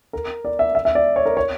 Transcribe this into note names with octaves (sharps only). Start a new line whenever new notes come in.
A#4
D5
E5
E5
E5
D5
C#5
A#4
C#5